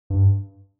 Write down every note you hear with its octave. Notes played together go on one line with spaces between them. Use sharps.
G2